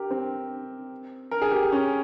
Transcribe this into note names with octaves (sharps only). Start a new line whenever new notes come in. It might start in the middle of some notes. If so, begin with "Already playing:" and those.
Already playing: G4 A#4
C4
A#4
G#4
G4
C#4